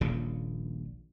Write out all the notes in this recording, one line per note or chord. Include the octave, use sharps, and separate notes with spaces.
D#1 A#1 A#2 C#3